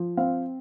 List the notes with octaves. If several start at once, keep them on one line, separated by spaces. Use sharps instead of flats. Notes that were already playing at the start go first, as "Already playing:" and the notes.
Already playing: F3
C4 F5